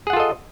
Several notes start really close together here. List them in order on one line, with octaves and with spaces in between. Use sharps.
G#4 F#5 F4 A4 D#5